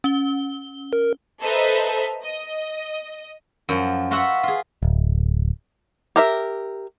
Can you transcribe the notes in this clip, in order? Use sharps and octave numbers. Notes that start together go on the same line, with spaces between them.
C#4 G7
A#4
A4 B4 C5 D#5 E5 A#5
D#5
F#2 F3
F4 F#4 B4 E5 F#5
F4 G#4
D1
G4 A#4 E5